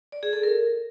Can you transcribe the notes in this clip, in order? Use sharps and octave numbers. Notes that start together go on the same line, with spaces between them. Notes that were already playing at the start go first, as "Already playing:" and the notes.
D5
G#4
A4
A#4